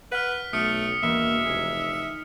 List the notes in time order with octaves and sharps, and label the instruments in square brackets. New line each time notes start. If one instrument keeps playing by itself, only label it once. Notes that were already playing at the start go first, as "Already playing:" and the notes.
[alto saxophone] B4 [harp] F#5 [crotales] F6 B6
[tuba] B1 [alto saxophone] A3 [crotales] D#6 F6 C#7
[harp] E1 B6 [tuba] A#3 [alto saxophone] E5
[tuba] F1 [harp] D#4 G#4